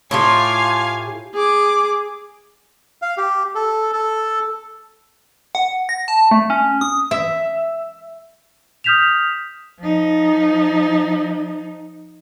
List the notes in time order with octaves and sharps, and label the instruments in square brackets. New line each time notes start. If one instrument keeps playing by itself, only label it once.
[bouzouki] A2 F4 G4 [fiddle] F5 G#5
[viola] G#4 D6
[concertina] F5
G4
A4
A4
[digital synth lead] F#5
A#6
A5
A3
C#4
D#6
[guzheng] E5
[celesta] D#6 F6 G6 B6 E7 F7
[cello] F3 D#4